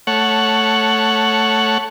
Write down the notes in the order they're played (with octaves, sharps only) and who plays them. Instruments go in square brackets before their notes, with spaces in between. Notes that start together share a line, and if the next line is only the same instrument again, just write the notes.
[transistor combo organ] A3 C#5 F#5